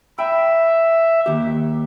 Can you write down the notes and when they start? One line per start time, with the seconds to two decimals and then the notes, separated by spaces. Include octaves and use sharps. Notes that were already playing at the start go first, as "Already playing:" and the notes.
0.19 E5 G5 B5
1.26 D#2 G4